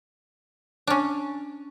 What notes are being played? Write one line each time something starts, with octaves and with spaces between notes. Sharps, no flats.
C#4 D4